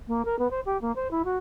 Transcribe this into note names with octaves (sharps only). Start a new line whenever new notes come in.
A#3
A#4
B3
C5
G4
A#3
C5
E4
F#4